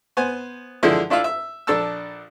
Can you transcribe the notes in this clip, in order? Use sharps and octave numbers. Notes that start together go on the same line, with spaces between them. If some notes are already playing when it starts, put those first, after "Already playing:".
B3 C5 G#5
D3 E3 F3 G#3 D4 E4
D4 E4 F4 E5 F5
E5
A#1 D4 A4 A5 E6